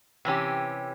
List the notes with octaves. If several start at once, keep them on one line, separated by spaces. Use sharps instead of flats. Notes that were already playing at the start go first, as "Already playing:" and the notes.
C3 E3 C#4 G4